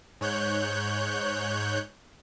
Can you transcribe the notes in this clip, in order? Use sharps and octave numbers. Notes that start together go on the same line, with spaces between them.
G#2 C#5 F#6 G6